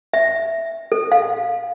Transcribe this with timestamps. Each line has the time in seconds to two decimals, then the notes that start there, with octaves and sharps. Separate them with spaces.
0.14 E5
0.92 A4
1.12 F5